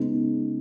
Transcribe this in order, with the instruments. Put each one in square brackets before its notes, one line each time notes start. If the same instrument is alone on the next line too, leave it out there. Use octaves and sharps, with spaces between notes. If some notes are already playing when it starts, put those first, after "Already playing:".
Already playing: [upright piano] C#3 G#3 B3 D#4